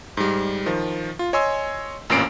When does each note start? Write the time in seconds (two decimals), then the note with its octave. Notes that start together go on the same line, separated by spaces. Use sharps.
0.17 G#2 G3
0.66 D#3 F3
1.19 F4
1.33 C#5 D#5 G#5 C6 E6
2.10 A1 F2 A#2 C#4 C7 D7